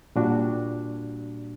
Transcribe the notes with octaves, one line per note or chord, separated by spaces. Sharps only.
A#2 G3 D4 F#4